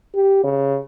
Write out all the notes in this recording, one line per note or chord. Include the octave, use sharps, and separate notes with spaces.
G4
C#3